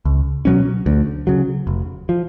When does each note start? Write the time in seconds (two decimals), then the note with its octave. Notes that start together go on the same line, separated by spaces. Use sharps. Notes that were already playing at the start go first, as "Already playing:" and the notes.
0.05 C#2
0.45 B2 F#3 C#4
0.86 D2
1.27 C#3 F#3
1.67 F1
2.09 F3